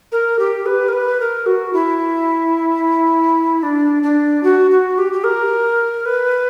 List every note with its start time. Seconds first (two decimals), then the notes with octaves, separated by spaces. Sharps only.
0.12 A#4
0.39 G4
0.66 B4
0.88 A#4
0.92 B4
1.20 A#4
1.46 F#4
1.73 E4
3.63 D4
4.03 D4
4.43 F#4
4.71 F#4
4.98 G4
5.13 G4
5.24 A#4
6.05 B4